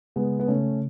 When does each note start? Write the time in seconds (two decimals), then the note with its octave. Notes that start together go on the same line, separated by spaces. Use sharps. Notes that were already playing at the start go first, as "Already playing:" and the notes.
0.16 C#3 G#3 B3
0.40 B3
0.48 C#3 A3 C#4